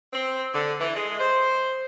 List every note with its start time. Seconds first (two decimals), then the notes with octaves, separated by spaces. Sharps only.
0.13 C4
0.54 D3
0.80 E3
0.94 G#3
1.19 C5